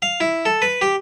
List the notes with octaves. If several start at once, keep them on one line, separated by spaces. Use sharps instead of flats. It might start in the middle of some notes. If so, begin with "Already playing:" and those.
F5
E4
A4
B4
G4